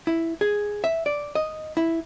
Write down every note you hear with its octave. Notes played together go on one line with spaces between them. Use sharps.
E4
G#4
E5
D5
D#5
E4